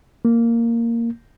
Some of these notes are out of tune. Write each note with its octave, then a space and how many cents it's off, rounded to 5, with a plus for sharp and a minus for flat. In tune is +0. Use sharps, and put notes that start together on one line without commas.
A#3 -10